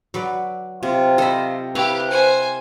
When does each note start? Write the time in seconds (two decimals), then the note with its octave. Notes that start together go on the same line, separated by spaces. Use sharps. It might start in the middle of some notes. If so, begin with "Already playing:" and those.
0.14 F#3 B4 D5
0.83 C3 F4
1.18 A4 C5 D#5 B5
1.75 E4 G4 B4 F5
2.10 C5 G#5